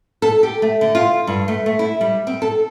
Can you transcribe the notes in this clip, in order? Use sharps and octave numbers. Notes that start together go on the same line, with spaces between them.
A4
G4
A3
D3
F4
G2
A3
A3
E4
G3
C4
A4